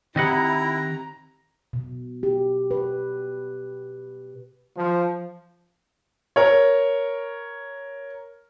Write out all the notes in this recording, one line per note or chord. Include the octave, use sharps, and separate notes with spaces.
D#3 C4 E4 G4 D#5 F#5 A#5
B2
G4
B4
F3
A#4 C#5